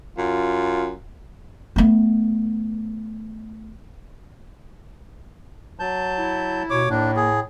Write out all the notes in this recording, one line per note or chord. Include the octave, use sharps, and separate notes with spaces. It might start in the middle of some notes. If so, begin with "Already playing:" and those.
F#2 F4
A3 B3
F#3 A5 G6
E4
D#2 B2 C#5 D6
A2 A#3 D4
G#4